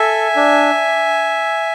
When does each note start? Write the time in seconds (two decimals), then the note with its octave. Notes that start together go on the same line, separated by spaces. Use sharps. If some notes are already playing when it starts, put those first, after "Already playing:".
Already playing: A4 E5 G#5
0.36 D4